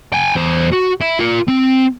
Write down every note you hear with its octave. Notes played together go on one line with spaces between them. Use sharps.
G5 G#5
E2 C5
F#4
E4
F4 A#4
C4